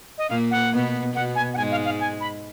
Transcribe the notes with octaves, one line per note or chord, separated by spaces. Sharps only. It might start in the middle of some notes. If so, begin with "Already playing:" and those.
D#5
A#2 A#3 F5
F#5
B2 B3
B2 B3 F#5
G#5
F#5
G#2 G#3 G#5
F5
F5
G#5
B5